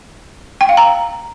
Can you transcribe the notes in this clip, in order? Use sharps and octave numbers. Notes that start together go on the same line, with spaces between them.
G5
F5
A#5